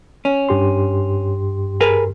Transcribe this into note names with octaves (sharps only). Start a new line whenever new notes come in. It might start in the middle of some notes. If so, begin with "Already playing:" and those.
C#4
G2 G4 C6
G#4 A#4 B4